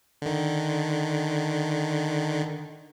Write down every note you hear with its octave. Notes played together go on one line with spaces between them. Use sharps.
D3 D#3